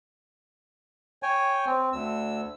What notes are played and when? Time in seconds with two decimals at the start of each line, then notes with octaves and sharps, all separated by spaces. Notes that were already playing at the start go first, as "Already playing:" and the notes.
1.23 C#5 G5 G#5
1.66 C4
1.93 D2 E6